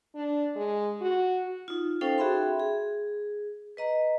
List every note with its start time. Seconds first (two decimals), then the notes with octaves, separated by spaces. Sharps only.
0.15 D4
0.56 G#3
1.01 F#4
1.68 D#4 F4
2.01 C#4 D#4 A4 C5 F5 G5
2.18 F#4 G#4 E5 G5 B5 C6
2.60 G#4
3.77 B4 D#5 A#5